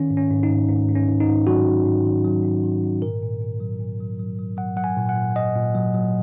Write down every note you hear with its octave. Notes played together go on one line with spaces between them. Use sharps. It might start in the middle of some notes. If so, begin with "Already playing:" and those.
Already playing: D#3 C#4
G#2
C#4
G#2
D#4
G#2
G#2
G#2
C#4
G#2
D#4
G#2
F#3 F#4
G#2
G#2
D#3
F#3
G#2
D#3
G#2
A#2 A#4
A#2
A#2
F#3
A#2
F#3
F#3
F#3
F#3 F#5
F#3 F#5
G#5
A#2
F#5
A#2
A#2 D#5
A#2
F#3
F#3